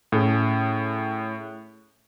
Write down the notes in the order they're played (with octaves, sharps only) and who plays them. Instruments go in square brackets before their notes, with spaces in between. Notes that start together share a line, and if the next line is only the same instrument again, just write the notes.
[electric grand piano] A2 C#4 G#4